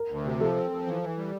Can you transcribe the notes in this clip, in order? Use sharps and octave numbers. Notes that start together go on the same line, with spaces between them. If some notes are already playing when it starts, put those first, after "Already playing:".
Already playing: A#4
D2
C3
F3 A4
C4
F3
E3
E3
G3